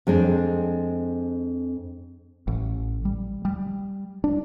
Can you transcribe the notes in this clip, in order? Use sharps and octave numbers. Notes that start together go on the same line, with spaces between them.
F2 G#3 C4 D4
A1
G3
G3
D4